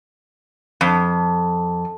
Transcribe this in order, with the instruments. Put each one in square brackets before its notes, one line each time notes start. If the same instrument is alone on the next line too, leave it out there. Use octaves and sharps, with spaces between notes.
[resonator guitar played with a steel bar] F2